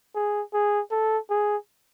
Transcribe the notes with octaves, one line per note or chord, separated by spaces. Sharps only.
G#4
G#4
A4
G#4